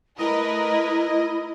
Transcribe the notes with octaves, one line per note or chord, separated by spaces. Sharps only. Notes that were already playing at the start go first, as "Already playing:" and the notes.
A3 E4 A#4 B4 D#5